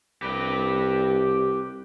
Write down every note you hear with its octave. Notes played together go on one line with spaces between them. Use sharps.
C2 G4 B4